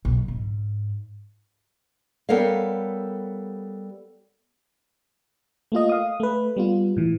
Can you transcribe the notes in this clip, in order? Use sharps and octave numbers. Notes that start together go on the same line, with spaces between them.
B1
G#2
G3 B3 A4 A#4 C#5 F5
A3 A#3 F4 D#5
F5 D#6
A3 B4
G3 B3 F4
A2 E3